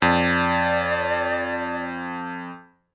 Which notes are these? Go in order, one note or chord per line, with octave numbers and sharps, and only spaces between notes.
F2 D5